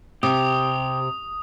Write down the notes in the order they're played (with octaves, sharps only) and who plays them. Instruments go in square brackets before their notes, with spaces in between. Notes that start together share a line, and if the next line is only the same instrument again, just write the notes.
[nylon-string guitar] C3 [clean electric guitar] G4 [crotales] D#6